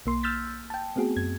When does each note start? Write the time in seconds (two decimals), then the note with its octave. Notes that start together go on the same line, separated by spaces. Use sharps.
0.06 B1 A#3 C6
0.23 E6 F6 G6 A6 B6
0.70 G5 A5
0.96 A3 B3 C4 F#4 G#4
1.16 F#2 G#6